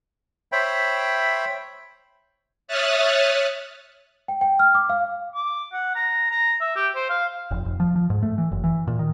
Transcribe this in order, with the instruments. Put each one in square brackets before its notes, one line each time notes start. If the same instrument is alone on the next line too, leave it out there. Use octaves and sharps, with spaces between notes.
[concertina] C5 C#5 E5 G5 B5
[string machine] C#5 E5 D#6 F6 F#6 A6
[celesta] G5
G5
F6
D6
F5
[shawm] D6
F#5
A#5
A#5
E5
G4
C5
F5
[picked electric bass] F1
F1
F3
F3
G#2
A3
E3
F#1
E3
A#2
D#3